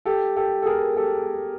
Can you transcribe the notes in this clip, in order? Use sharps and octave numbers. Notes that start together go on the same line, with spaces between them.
G4 A4
G4 A4
A4
G#4 A#4
G4 A4